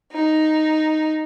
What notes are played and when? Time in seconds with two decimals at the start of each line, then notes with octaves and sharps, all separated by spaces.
0.12 D#4